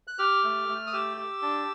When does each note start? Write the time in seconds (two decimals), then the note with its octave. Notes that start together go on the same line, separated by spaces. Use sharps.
0.08 F#6
0.19 G4 F6
0.44 A3
0.68 A3
0.87 D#6
0.93 G4 E6
1.17 G4
1.42 D4